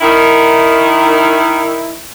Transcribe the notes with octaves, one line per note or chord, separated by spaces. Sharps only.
D#3 E4